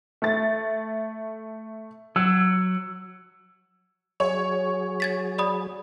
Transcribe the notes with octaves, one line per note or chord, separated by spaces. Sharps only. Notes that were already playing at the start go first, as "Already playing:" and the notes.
A3 A6
F#3 E6
F#3 G#4 C#5
G#6 A6 B6
D5 B5 D#6